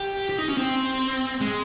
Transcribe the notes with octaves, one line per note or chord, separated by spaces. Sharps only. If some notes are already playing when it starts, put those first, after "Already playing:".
Already playing: G4
G4
D#4
C#4
C4
G#3